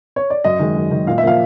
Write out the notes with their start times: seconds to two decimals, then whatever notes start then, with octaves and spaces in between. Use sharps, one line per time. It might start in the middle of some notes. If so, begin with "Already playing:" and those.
0.16 C#5
0.30 D5
0.44 F#2 D#5
0.59 D#3 G#3
0.76 F#2
0.91 D#3 G#3
1.07 A#2 F5
1.18 E5
1.23 F3 A#3 F5